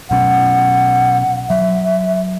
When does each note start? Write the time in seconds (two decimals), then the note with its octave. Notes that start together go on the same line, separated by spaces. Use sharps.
0.10 B2 F#3 C#4 F#5
1.49 F#3 E5